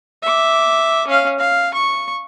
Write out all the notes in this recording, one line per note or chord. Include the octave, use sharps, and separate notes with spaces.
E5 D6
C#4 F5
F5
C#6